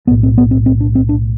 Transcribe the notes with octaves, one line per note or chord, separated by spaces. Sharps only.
B1 A2 B3
C4
B3
C4
C4
D4
C4
D4